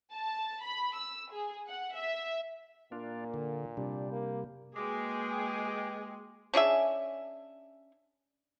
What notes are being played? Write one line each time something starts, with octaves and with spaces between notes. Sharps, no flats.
A5
B5
E6
G#4
F#5
E5
A#2 A#3 D4 F4
D3
C3 G3 D4
A#3
G#3 A#3 F#4 G#4 B4 G5 D6
C#4 D4 G#4 E5